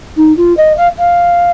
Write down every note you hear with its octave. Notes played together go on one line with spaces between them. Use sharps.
D#4
F4
D#5
F5
F5